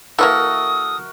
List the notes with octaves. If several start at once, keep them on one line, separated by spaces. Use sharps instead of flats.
E3 G#3 A#3 F#4 A4 A#4 E5 D#6